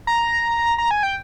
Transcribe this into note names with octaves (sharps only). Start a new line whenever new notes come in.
A#5
A#5
G#5
G5